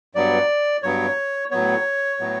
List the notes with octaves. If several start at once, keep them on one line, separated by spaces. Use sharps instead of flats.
G2 F#3 B3 D5
G2 F#3 B3 C#5
A2 F#3 B3 C#5
A2 F#3 B3